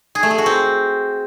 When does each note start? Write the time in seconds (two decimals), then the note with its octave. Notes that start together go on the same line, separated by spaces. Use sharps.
0.15 G#4
0.23 A3
0.31 G#4
0.38 F#4
0.46 C4